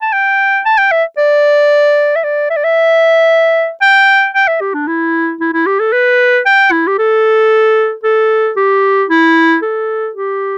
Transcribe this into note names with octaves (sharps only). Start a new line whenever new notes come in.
A5
G5
A5
G5
E5
D5
E5
D5
E5
D5
E5
G5
G5
E5
G4
D4
E4
E4
E4
G4
A4
B4
G5
E4
G4
A4
A4
G4
E4
A4
G4